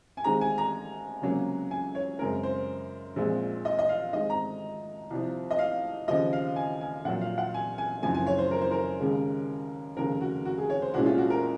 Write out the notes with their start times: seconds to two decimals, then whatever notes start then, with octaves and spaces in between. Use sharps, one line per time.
0.17 G#5
0.24 D#2 D#3 G#3 C4 A#5
0.41 G#5
0.58 A#5
1.22 C#2 C3 F#3 A#3 C#4
1.71 G#5
1.95 C#5
2.19 F#2 C#3 G#3 C4 A#4
2.43 C5
3.16 A#1 A#2 G#3 C4
3.65 D#5
3.79 D#5
3.89 F5
4.13 G#2 D#3 G#3 C4 D#5
4.30 A#5
5.10 C2 C3 F3
5.51 D#5
5.59 F5
6.08 D#2 C#3 F3 D#5
6.33 F5
6.56 G#5
6.81 G#5
7.05 A#1 A#2 F#3 F#5
7.21 F5
7.38 F#5
7.54 G#5
7.78 G#5
8.02 F#1 F#2 F3 C4 G#5
8.14 G#5
8.27 C#5
8.38 C5
8.51 A#4
8.61 C5
8.71 A#4
9.00 D#2 C#3 G#3
9.96 F1 D#2 C#3 A#4
10.21 F#4
10.46 F#4
10.58 G#4
10.70 C#5
10.82 C5
10.94 C2 A#2 G#3 C#4 F#4
11.06 F4
11.18 F#4
11.30 A#4